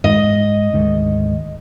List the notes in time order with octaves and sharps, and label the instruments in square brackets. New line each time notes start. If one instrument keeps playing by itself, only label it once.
[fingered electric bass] G#2 [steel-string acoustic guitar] D#5
[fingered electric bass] D2 G#2 D#3